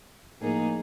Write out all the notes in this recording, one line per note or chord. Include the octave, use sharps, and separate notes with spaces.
A2 F3 A#3 D#4 G#4